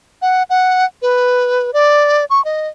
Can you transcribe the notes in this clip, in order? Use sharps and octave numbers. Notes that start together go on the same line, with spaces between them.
F#5
F#5
B4
D5
C#6
D#5